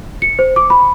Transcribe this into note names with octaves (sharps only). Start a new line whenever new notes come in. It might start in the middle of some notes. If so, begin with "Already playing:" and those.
C#7
C5
D6
B5